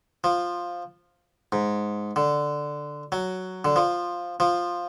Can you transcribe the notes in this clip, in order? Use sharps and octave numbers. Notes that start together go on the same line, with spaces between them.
F3
G#2
D3
F#3
D3
F3
F3